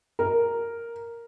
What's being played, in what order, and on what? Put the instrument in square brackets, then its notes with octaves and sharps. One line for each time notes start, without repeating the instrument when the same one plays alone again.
[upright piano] A#4